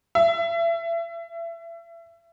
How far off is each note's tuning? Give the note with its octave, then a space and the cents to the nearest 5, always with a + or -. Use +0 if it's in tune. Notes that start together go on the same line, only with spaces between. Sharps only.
E5 +30